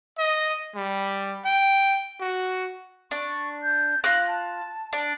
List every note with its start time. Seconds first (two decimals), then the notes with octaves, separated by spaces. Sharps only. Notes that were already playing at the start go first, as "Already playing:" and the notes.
0.18 D#5
0.75 G3
1.45 G5
2.20 F#4
3.11 D4 C#6
3.63 G6
4.04 F4 F#6 A#6
4.27 A5
4.93 D4